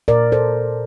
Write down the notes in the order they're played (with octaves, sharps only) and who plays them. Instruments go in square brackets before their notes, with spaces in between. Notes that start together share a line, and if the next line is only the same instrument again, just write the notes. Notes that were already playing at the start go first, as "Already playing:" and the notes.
[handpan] A#2 A#4 D5
A4 C5